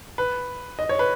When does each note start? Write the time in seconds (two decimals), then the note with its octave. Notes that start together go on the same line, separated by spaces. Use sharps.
0.18 B4
0.79 D#5
0.89 C#5
0.99 B4